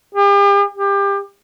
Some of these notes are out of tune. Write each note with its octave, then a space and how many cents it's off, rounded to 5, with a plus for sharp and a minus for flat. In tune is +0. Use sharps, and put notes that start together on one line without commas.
G4 +40
G4 +25